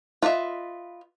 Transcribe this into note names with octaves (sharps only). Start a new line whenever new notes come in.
F4 B4 D#5 E5